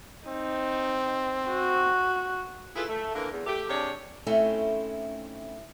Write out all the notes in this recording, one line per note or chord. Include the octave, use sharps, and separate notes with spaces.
C4 D#4
F#4
E4 F4 G#4 A4 B4
A3
D3 E3 A#3 A#4
E2
A3 G4
C3 D4 G4 G#4 C#5
A3 C4 C#4 D#4 E4